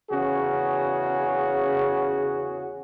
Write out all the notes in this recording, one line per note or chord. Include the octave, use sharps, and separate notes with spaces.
E2 C#3 C#4 F#4 G#4